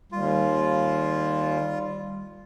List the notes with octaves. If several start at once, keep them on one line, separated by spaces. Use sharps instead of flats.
D#2 G3 F4